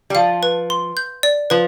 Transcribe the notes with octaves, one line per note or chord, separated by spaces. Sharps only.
G3
F3 F5
B4
C6
G6
D5
F3 B4